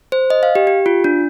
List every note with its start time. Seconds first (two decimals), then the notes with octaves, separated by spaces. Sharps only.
0.12 C5
0.30 D#5
0.43 F5
0.55 G4
0.67 G4
0.86 F4
1.04 D4